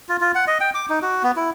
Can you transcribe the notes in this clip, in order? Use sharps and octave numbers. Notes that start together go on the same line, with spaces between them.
F4
F4
F#5
D#5
G5
D6
D#4
F#4
B3
E4